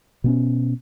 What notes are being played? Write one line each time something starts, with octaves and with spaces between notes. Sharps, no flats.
B2 B3 C#4